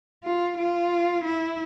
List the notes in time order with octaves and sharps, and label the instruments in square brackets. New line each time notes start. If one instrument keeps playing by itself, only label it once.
[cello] F4
F4
E4